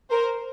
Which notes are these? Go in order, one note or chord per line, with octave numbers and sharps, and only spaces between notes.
A#4 C5